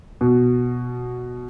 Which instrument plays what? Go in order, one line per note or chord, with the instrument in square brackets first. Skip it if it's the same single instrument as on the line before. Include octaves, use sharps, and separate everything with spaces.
[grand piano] B2